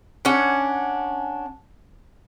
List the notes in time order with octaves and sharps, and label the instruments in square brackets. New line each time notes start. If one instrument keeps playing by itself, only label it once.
[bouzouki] C#4 D4 F#5